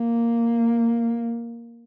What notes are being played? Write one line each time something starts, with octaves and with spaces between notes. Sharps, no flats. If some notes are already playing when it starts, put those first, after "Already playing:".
Already playing: A#3